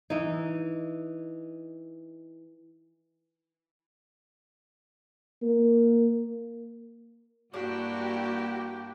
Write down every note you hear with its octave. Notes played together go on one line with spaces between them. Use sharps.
E3 D#4
A#3
G2 A#3 D4 E4 F#4 G4 G5